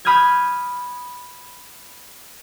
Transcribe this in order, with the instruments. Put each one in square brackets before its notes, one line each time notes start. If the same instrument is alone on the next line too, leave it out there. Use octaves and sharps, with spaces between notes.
[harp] B5 D#6 F6 G6 G#6